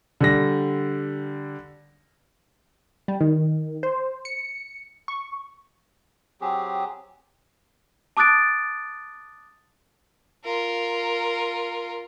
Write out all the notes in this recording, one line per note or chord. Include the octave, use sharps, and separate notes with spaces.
D3 G3 A#6
G3
D#3
C5
C#7
C#6
F#3 C4 G4 G#4
A5 D6 D#6 F#6 A6 D7
F4 A#4